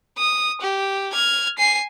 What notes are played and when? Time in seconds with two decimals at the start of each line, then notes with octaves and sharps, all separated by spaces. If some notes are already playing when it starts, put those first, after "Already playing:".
0.18 D#6
0.61 G4
1.13 F6 G#6
1.58 G#5 C7